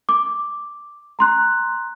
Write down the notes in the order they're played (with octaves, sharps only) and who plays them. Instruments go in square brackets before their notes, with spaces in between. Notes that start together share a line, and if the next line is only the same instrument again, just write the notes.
[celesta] D6
A#5 C6 F#6